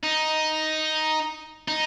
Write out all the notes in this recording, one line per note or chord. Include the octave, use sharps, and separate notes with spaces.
D#4
D#4